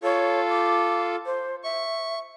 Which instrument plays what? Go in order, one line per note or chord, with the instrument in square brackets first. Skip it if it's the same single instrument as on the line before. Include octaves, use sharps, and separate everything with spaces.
[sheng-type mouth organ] F4 A4 [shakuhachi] C#5
[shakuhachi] D6
C5
[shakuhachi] E5 [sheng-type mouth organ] C#6